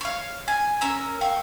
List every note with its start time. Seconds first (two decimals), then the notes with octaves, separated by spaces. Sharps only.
0.01 C#5 F5
0.48 G#5
0.81 C#4 A#4 E6
1.21 F5 G5 C#6